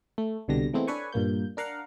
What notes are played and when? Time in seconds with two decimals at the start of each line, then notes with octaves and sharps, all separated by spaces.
0.18 A3
0.48 C2 B2 D3 G3 A#6
0.74 E3 G#3 A3 B3 C4 E4
0.87 D4 A4 B4 C#5 G#5 C#6
1.12 G2 A#2 A#3 G6
1.57 D4 A#4 F5 F#5